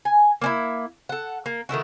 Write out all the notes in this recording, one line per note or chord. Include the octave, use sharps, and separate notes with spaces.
G#5
A#3 C#4 E4
A4 F#5
A#3
D#3 A3 E4 F#4